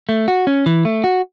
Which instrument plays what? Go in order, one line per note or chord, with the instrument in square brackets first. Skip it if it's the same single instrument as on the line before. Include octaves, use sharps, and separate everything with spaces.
[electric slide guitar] A3
F#4
C#4
E3
A3
F#4